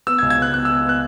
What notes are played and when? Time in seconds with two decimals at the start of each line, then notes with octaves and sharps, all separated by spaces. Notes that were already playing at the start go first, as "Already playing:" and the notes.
0.07 B3 E6
0.18 G#6
0.22 C#2
0.30 G#6
0.38 B3 F#6
0.54 B3 F#6
0.65 B3 E6
0.85 B3 F#6